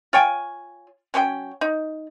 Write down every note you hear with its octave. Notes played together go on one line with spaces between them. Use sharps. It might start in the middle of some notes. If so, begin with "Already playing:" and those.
F4 C#5 G5 G#5
F#3 C#4 B4 G5
D#4